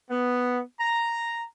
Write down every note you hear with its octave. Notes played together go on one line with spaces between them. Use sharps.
B3
A#5